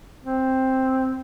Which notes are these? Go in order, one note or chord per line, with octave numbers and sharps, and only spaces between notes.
C4